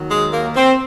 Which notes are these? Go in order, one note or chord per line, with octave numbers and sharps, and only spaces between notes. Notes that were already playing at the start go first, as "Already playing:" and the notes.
Already playing: D#2 D#3 F#3
G#3
A#3
C4